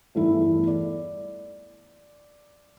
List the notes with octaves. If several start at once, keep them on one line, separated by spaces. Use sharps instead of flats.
G1 E2 A3 E4
D5